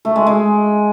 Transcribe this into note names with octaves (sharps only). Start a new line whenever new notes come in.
A3
G#3
G#3